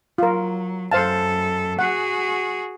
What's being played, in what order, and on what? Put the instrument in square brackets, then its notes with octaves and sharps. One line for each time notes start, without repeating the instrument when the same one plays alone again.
[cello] F#3 [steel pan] F4 A#4
[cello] F#2 A4 [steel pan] C5 F5 A5
[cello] F#4 G#4 [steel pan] F#5